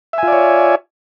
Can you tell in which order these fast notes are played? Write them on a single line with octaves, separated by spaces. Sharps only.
E5 G#5 F4 D5 C#5